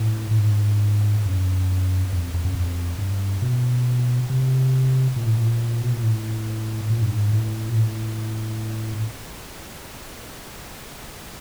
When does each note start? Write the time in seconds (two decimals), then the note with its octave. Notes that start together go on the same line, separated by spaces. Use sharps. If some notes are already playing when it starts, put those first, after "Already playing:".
Already playing: A2
0.31 A2
0.38 G#2
1.26 F#2
2.13 F2
2.34 F2
2.45 F#2
2.55 F2
2.98 G2
3.42 B2
4.30 C3
5.16 A#2
5.27 A2
5.37 A#2
5.82 B2
5.93 A#2
6.03 A2
6.90 A#2
7.02 G2
7.11 G#2
7.33 A2
7.69 A#2
7.77 A2